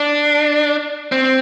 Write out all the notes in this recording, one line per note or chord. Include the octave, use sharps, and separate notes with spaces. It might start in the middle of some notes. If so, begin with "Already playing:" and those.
Already playing: D4
C4